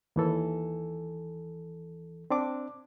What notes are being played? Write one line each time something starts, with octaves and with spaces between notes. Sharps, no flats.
D#2 E3 A4
C4 D4 D6